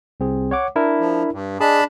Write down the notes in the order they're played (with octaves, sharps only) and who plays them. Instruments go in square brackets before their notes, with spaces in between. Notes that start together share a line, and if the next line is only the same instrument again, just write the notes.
[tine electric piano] C2 C4 G#4
C#5 F#5 D6
D4 E4 A#4
[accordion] F3
G2
[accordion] D4 A5 B5 [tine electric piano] G#4 D#5